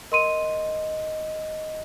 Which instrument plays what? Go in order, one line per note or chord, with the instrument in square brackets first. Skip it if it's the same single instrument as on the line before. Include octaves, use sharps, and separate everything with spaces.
[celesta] A#4 C6 D#7 [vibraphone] D#5